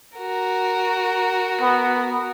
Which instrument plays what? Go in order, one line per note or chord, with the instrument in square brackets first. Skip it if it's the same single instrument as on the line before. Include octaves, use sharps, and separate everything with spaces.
[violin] F#4 A#4
[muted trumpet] B3